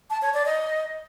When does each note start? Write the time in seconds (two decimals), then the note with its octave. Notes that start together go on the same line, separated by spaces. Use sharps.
0.10 A5
0.22 C#5
0.34 D5
0.46 D#5